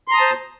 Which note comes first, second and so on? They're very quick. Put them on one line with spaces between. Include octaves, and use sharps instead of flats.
C6 A#5 D#6 A5 C5